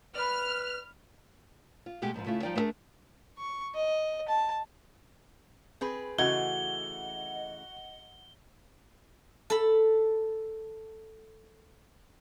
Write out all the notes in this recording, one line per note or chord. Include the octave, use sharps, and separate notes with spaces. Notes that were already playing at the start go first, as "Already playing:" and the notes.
B4 D5 B5 F6
F4
B2 G#3 A3 G4
F2 G#2 D#3 F3
C#3 A3 E4 F4
F3 G3 D#4 F4 D5 G5
A3 B3 D4 G#4 A#4
C#6
D#5
A5
C4 G#4 B4
C#3 E3 A3 F#4 D#5 F#5 G#6 G7
A4 B5